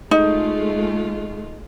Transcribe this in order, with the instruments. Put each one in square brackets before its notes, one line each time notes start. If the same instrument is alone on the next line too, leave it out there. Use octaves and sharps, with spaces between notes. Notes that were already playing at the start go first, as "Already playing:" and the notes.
[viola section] G#3 A3 F4 [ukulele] D#4